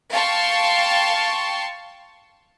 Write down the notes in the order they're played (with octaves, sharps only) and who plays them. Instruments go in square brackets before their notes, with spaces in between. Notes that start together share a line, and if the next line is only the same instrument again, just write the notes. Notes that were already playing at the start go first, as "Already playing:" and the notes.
[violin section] F5 G5 A5 C6 C#6